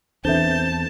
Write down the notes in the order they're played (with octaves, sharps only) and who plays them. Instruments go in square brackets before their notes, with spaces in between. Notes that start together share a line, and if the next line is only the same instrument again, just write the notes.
[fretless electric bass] E2 E3 [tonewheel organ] C4 G6 [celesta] D4 A4 E5 [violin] A5